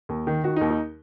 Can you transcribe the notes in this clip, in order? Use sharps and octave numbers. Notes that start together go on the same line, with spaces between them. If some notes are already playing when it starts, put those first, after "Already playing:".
D#2
D#3
D#3 F#4
D#4
D#2
D#4